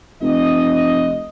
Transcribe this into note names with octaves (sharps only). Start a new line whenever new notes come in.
F1 D#5